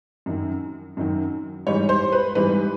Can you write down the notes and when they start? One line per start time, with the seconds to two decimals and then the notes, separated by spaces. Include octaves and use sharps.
0.26 F#2 D#3 F#3
0.97 F#2 D#3 F#3
1.67 G#2 E3 G3 C#5
1.89 C5
2.12 B4
2.35 G#2 E3 G3 B4